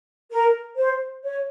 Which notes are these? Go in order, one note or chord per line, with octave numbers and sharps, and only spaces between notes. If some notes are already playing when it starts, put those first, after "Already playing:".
A#4
C5
C#5